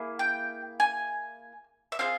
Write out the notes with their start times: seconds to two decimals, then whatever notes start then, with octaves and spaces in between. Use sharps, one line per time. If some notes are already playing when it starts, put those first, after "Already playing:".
Already playing: A#3 E4 G#4
0.19 G5
0.80 G#5
1.92 E5
1.99 C4 F4 G#4 F5